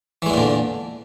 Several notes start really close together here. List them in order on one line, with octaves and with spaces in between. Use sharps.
E3 G#3 E2 A#2 D3